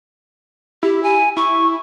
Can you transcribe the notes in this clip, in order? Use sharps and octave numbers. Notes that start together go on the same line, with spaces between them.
E4 G4
G#5
E4 C#6